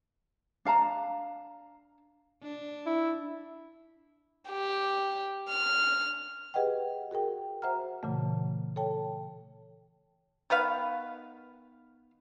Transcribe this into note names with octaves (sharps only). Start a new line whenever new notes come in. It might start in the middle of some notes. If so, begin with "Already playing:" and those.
D4 F5 A5 A#5
D4
E4
G4
F6
G4 G#4 B4 D#5 F#5 G5
F#4 G#4 A#4 G5
F#4 C5 E5 F#5 A#5 F6
A#2 C#3 E3 A3
A4 C#5 G5 A5
D#3 B3 B4 F5